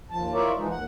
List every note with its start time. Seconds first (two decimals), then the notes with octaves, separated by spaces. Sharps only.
0.11 D#2 F3 A5
0.33 E4 F4 A#4 C#5 D5 E5
0.56 E3 F3 G#3 D#4
0.70 D#2 F#5